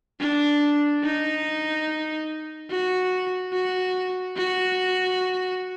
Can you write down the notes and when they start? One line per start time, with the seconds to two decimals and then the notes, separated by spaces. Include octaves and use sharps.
0.20 D4
1.03 D#4
2.70 F#4
3.53 F#4
4.37 F#4